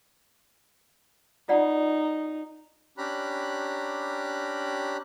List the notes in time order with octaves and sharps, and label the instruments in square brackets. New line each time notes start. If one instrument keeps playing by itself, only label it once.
[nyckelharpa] D#4 [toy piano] F4 D5 F#5
[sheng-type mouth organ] C#4 D4 G4 A#5 B5 F#6